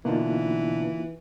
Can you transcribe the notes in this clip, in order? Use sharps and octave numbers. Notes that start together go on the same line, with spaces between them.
B2 D3 E3 A#3 D4 D#4 F4